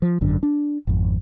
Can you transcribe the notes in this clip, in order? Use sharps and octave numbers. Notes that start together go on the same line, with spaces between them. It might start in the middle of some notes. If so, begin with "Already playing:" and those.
F3
G#1 F#2 D3
D4
G#1 F2